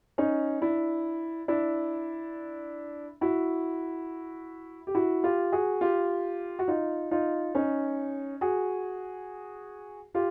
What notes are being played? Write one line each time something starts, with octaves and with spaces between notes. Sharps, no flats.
C#4 D#4
D4 E4
D4 E4
E4 F#4
G4
E4 F#4
F4 G4
F#4 G#4
F4 G4
F#4
D#4 F4
D#4 F4
C#4 D#4
F#4 G#4
F4 G4